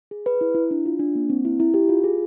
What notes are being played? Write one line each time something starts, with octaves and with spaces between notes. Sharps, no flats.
G#4
B4
E4
E4
D4
F4
D4
A#3
C4
E4
E4
G4
F4
G#4